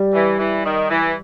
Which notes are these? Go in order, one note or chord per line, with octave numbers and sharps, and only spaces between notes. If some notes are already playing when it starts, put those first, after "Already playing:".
Already playing: G3
E3
E3
D#3
E3